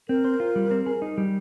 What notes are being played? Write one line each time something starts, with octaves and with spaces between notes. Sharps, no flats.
C4 A#4
C5
F4
G3
C4
G#4
D#4
G3